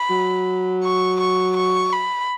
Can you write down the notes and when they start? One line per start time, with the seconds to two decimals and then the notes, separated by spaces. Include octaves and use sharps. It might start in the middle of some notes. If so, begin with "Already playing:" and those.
Already playing: B5
0.10 F#3
0.83 C#6
1.20 C#6
1.56 C#6
1.92 B5